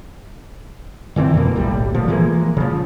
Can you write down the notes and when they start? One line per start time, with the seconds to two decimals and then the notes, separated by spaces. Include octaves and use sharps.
1.16 D3 E3 G3 C4
1.34 F2 B2 A#3
1.56 F#1 B1 A2 G3
1.94 A#2 F3 A3
2.08 E3 F3 G#3 A#3
2.57 C#3 F3